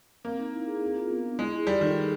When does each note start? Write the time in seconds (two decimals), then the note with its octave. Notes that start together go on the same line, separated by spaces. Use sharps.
0.24 A#3 C4
0.39 D#4
0.53 E4
0.67 G#4
0.82 C4
0.96 F4
1.10 B3
1.24 D4
1.38 G#3 E4
1.53 G#4
1.67 G3 F4
1.81 D#3 A4
1.95 G#4